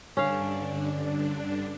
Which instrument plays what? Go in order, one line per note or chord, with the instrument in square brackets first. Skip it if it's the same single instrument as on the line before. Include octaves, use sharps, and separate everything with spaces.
[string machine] G2 D3 D4 [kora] C#4 F5